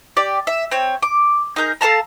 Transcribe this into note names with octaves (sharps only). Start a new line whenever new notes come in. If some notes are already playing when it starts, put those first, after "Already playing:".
G4 D5
E5
C4 C#5
D6
D#4 G#4 A#4 G6
A4 F5 A5 A#5